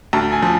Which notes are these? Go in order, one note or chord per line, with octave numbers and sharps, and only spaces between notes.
D2 A5
G#5
F3